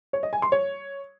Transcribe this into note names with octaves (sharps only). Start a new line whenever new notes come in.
C#5
D#5
G#5
C6
C#5